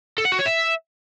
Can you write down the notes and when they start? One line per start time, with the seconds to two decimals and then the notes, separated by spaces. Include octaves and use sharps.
0.18 A4
0.25 F#5
0.32 F#4
0.39 C#5
0.46 E5